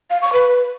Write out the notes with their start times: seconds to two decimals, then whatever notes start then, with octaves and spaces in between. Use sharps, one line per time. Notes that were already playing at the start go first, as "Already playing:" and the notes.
0.10 F5
0.22 C#6
0.33 B4